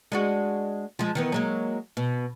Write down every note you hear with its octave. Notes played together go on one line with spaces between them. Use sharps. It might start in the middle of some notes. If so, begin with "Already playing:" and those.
G#3 D4 F#4
F3 G#3
D#3 E3 B3
F#3 G#3 A#3
B2